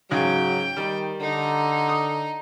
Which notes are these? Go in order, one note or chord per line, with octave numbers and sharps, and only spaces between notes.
G#2 C#3 F#3 G5
D#3 G3
D3 D#4
D#6